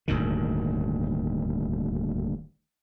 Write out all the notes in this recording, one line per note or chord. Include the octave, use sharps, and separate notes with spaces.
D#1 D2 G#2 D#3